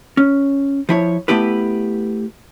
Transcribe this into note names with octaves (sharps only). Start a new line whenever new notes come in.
C#4
F3 E4 C#5
A3 B3 E4 G4 B4